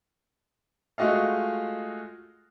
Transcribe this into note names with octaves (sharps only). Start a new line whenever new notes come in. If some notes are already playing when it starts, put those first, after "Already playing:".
G#3 A3 F4 F#4 D#5 F5